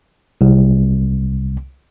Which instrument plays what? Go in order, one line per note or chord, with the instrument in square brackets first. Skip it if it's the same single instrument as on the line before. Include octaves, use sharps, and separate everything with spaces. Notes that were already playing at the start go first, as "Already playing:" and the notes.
[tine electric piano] C2